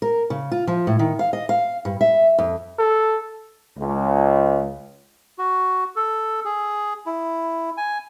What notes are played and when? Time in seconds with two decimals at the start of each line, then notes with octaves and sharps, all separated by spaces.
0.02 A#4
0.30 C#3
0.52 F4
0.67 F3
0.87 A2
0.99 D#3
1.19 F5
1.33 D#5
1.49 F5
1.85 G2
2.01 E5
2.39 F2
2.79 A4
3.78 C#2
5.38 F#4
5.96 A4
6.45 G#4
7.06 E4
7.77 G#5